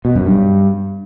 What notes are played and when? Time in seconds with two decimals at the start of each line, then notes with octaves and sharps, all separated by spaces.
0.05 B2
0.15 F#2
0.26 G2